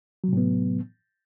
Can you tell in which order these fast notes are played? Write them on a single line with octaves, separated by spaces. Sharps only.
F#3 C3 A2 B3